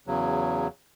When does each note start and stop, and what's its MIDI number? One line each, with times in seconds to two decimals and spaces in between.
0.07 0.67 40
0.07 0.67 49
0.07 0.67 54